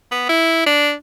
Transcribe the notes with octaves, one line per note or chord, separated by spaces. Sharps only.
B3
E4
D4